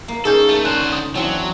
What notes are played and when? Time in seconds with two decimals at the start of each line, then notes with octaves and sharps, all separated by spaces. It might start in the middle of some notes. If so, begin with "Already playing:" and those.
0.08 A#3
0.25 A#3 C#4 D#4 G#4 A4 G6
0.49 A3 A5
0.65 D3 C#4 C5 F#6
0.92 D#6
1.15 E2 F#3 C4 D4